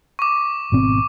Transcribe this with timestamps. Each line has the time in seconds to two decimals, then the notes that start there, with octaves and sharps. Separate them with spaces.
0.19 C#6 D6
0.72 G#1 B2 C4